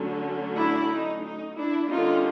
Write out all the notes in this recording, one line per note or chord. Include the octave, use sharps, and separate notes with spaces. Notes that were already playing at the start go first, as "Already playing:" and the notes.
Already playing: D3 F#3 A3 C#4
D4 E4
D#4
D#4
D4 E4
D3 G3 A#3 C#4 D#4 F4